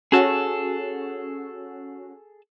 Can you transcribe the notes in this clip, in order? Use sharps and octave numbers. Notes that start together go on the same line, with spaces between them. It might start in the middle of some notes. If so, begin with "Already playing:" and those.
C#4 F#4 G#4 A4